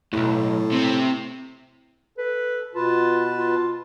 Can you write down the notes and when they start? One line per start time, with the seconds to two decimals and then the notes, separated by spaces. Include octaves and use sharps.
0.13 B1 E2 A2
0.72 C3 C4
2.18 A4 B4
2.75 B2 F4 B4 A5
3.39 F4